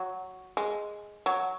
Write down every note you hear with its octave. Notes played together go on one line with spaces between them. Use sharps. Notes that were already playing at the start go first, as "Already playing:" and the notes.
Already playing: F#3
G#3
F#3